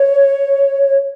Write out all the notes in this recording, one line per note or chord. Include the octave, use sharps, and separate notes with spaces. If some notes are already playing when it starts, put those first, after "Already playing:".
Already playing: C#5